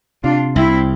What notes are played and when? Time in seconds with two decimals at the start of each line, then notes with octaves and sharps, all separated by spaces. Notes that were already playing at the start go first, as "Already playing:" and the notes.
0.23 C3 D4 F4
0.55 C2 C4 E4